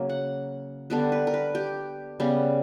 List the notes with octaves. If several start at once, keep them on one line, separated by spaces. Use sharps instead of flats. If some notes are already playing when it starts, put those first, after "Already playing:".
Already playing: C#3 F#3 A#3
F#5
D3 G3 B3 B4
B4
A#4
B4
G4
C#3 G3 B3